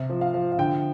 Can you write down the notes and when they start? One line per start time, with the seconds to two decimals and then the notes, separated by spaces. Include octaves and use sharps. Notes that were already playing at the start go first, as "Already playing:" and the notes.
Already playing: C3
0.10 F3
0.21 F5
0.34 F3
0.52 F5
0.58 D3 G5